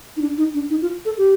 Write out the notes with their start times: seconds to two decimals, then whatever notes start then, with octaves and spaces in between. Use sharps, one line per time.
0.17 D#4
0.22 D4
0.38 D#4
0.54 D4
0.70 D#4
0.82 F4
1.05 A4
1.18 G4